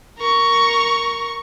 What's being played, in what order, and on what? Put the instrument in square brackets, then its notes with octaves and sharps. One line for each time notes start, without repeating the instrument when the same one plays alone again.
[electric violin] A#4 C#6